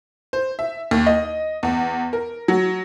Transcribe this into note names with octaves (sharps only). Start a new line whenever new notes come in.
C5
E5
D#2
D#5
E2
A#4
F#3